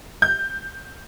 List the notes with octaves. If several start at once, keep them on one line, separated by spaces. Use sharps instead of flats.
G6